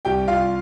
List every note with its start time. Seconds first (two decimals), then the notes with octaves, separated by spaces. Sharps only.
0.05 C2 G4 G5
0.28 C2 F4 F5